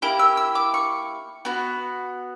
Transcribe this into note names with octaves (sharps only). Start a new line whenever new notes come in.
A#3 E4 G4 D6
E6
E6
D6
C#6
B3 F#4